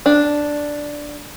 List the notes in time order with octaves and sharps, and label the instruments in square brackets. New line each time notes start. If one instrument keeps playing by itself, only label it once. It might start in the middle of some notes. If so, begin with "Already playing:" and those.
[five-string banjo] D4